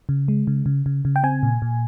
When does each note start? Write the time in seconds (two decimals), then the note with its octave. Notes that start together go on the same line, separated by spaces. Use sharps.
0.09 C#3
0.28 G#3
0.47 C#3
0.66 C#3
0.86 C#3
1.05 C#3
1.16 G5
1.23 C4 G#5
1.43 A#2
1.62 A#2